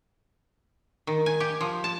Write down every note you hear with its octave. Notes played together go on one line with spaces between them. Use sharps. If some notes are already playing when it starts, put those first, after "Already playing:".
D#3
G#5
G4
F3
A5